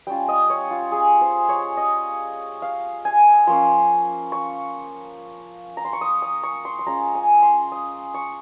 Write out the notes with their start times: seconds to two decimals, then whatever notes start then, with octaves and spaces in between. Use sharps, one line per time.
0.07 G3 C#4 F4 G5
0.28 D#5
0.50 C#5
0.70 F4
0.92 G#4
1.21 C5
1.49 C#5
1.77 D#5
2.62 F5
3.05 G#5
3.47 F3 A#3 C#4 C6
4.32 C#6
5.77 A#5
5.85 C6
5.93 C#6
6.01 D#6
6.22 D#6
6.43 C#6
6.65 C6
6.79 C6
6.86 G#3 C#4 F4 A#5
7.15 G#5
7.42 C6
7.72 D#6
8.14 C#6